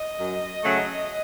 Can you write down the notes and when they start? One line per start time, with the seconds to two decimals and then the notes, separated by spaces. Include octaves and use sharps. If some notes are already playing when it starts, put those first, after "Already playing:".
Already playing: D#5
0.20 F#2
0.64 C#3 F#3 A3